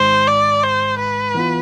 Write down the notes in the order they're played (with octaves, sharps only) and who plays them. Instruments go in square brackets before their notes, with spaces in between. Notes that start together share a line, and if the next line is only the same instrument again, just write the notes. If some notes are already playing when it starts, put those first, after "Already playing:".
Already playing: [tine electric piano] G#1 G#2 G#3 [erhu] C5
[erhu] D5
C5
B4
[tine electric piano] E3 B3 F4